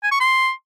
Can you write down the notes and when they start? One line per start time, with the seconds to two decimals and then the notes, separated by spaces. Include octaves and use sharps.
0.03 G#5
0.12 C#6
0.20 C6